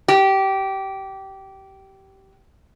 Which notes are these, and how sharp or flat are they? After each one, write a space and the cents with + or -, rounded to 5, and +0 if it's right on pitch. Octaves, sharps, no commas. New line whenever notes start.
G4 -20